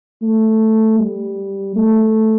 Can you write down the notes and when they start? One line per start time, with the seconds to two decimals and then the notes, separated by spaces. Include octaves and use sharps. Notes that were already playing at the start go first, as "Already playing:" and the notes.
0.22 A3
0.99 G3
1.76 A3